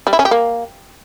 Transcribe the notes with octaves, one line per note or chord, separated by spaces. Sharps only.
G3
E4
C#4
G4
A#3